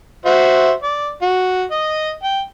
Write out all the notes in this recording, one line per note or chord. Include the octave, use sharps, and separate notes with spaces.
F#4 C5 E5
D5
F#4
D#5 D#6
G5